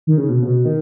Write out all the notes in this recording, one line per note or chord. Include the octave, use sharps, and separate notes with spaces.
D#3
C#3
B2
C#3
B2
D#3